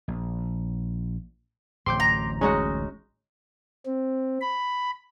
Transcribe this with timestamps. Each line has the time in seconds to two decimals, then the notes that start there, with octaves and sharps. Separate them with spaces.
0.08 A#1
1.86 D1 A1 C4 C6 D6 G6
2.00 A#5
2.41 G#3 C#4 D#4 F#4
3.86 C4
4.41 B5